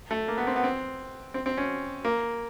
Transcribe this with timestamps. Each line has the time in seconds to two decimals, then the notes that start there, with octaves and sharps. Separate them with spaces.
0.11 A3
0.28 A#3
0.38 B3
0.47 C4
0.56 B3
0.64 C4
1.34 C4
1.46 C4
1.57 C#4
2.05 A#3